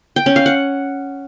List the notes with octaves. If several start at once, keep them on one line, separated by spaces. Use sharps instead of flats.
G5
C#4
F5
F#5